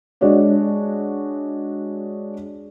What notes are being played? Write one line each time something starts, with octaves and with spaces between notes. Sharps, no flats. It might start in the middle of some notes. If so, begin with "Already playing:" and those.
G#3 D4 F#4 C#5 D5